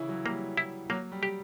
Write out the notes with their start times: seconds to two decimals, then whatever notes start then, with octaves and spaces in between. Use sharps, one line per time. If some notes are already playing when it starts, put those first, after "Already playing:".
Already playing: C#3 E3 C#4 E4
0.09 F#3
0.25 G3 A#3
0.57 E4
0.89 F#3 A#3
1.12 G3
1.23 G4